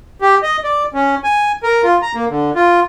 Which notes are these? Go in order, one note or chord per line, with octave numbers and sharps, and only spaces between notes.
G4
D#5
D5
C#4
G#5
A#4
F4
A#5
A#3
D3
F4